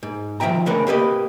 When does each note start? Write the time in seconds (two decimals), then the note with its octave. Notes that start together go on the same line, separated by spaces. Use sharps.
0.03 G#2
0.40 D#3 F3 C#4 E5 G5 A#5
0.66 C#3 A3 D4 A#4 B4
0.87 A#3 G4 B4 D#5